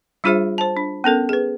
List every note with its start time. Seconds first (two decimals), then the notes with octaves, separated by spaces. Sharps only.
0.24 G3 D4 F4 G#4 C5 E5
0.58 C5 A5
0.77 D4
1.04 B3 C#4 A4 A#4
1.29 G#4 B4